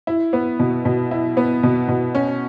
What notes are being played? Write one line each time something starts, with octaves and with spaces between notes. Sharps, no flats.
E4
B3
B2
B2
E4
B3
B2
B2
C#4